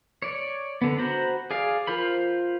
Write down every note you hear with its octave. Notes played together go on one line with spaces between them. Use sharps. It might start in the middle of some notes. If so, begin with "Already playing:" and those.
C#5 D5
D3 B3
F#4 C5 A#5 B5
G#4 D5 F5
F4 A#4 C5 B5